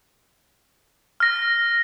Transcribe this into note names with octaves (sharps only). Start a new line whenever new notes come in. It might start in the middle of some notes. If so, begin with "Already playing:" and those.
F6 A#6